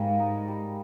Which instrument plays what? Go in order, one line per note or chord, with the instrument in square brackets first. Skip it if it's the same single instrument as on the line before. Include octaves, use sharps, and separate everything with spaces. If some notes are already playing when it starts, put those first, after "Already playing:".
Already playing: [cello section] G#2 [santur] G3 A#3 C#4 G#4
[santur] D#4
G3